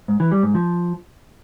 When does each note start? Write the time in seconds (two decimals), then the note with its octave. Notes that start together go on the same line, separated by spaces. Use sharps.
0.08 G#2
0.20 E3
0.32 G3
0.43 G#2
0.55 F3